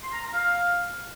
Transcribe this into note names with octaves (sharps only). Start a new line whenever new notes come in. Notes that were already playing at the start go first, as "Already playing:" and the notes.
C6
A#5
A#5
F5